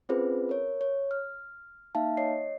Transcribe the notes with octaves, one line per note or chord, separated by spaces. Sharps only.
C4 C#4 F4 G#4 B4 C5
A#4 C#5
C#5
F6
A#3 D#4 E5 F5 A5
C#5 D#5 C7